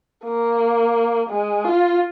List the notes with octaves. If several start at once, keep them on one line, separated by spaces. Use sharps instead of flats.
A#3
G#3
F4